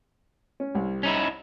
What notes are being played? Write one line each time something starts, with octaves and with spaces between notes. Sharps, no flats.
C#4
C2
C#4 D#4 E4